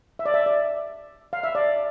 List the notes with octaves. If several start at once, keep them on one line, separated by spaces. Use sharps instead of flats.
E5
D5
E5
D5
F5
E5
D5